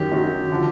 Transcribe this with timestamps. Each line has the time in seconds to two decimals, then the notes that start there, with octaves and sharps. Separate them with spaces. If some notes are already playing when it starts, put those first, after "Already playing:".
Already playing: F#2 D#3 F#3 G4
0.12 F#2 D#3 F#3
0.52 D3 F3